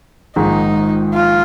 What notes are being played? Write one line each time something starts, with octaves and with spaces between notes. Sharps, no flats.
A#1 G#2 D#3 G#3 D#4
F4